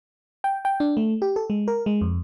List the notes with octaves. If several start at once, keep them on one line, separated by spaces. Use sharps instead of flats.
G5
G5
D4
A3
G4
A4
G#3
A#4
G#3
F2